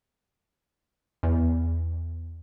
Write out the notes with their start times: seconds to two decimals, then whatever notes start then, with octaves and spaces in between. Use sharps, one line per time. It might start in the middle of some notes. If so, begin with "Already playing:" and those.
1.23 E2